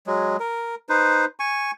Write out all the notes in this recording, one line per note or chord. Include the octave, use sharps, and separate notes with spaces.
F#3 G#3
A#4
D#4 B4 C5
G#5 C#6